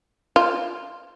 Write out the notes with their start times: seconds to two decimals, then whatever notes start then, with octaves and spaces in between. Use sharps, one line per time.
0.36 F4